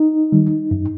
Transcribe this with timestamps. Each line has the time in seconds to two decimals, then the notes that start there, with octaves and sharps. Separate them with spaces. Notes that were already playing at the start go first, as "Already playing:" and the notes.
Already playing: D#4
0.32 D#3 G3
0.71 F#2